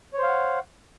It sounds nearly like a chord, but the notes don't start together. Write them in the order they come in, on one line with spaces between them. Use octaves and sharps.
C#5 C5 F5 F#5